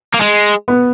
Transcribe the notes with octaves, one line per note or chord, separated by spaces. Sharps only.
A#3
G#3
B3